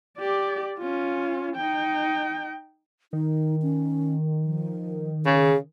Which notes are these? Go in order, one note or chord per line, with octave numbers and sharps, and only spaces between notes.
G4 D5
C#4 F4
D#4 G5
D#3 D#4
C#4
F3
C#3 G#4